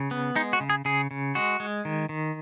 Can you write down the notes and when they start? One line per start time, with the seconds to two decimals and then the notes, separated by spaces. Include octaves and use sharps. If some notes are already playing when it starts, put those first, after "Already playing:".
Already playing: C#3
0.11 B3
0.36 G#3 D#4
0.53 F#4
0.60 C#3
0.70 G#4
0.85 C#3 G#4
1.11 C#3
1.35 G#3 F#4
1.60 G#3
1.85 D#3
2.09 D#3